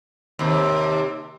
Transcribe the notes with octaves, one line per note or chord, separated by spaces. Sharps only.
D#2 C3